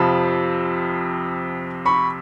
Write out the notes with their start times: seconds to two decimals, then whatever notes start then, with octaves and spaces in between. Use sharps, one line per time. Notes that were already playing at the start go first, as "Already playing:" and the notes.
Already playing: F2 C3 F3 A5 B5
1.86 B5 C#6